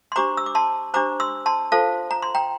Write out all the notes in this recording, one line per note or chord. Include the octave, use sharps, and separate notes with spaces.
C6
D4 G4 C5 A#5 D6
E6
D6
A5 C6
D4 G4 C5 A#5 D6
C6 E6
A5 C6
F4 A4 C5 F5 A5
A#5
C6
G5 A#5